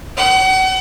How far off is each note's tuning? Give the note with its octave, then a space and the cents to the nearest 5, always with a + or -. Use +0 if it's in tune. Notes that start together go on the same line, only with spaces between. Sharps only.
F#5 +35